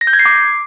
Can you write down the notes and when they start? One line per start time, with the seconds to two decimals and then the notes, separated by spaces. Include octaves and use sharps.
0.01 A#6
0.07 G6
0.13 G#6
0.19 C7
0.25 D6